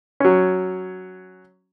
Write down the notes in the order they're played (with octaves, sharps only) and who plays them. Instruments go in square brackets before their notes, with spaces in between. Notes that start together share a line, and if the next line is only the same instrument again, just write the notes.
[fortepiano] F#3 C#4